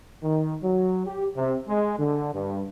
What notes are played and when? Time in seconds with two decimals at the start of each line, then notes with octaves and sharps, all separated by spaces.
0.22 D#3
0.62 F#3
1.06 G4
1.36 C3
1.68 G#3
1.99 D3
2.33 G2